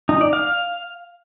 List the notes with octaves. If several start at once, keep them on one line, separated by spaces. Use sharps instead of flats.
D#4
D5
F5